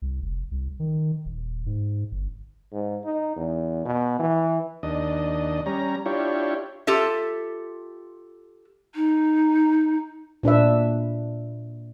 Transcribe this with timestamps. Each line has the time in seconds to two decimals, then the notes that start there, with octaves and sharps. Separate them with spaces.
0.02 C2
0.22 F1
0.51 C2
0.80 D#3
1.26 D#1
1.66 G#2
2.12 G1
2.72 G#2
3.05 D#4
3.36 E2
3.85 B2
4.19 E3
4.83 D#2 D4 D#5
5.66 G3 C#4 A#5
6.06 D4 E4 F4 G4 C#5
6.87 F4 G4 A4 E5
8.95 D#4
10.43 A#2 D4 B4 E5